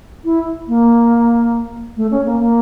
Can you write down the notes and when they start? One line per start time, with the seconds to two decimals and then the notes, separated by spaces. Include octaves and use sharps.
0.25 E4
0.68 A#3
1.97 A3
2.11 C#4
2.26 A#3
2.40 A#3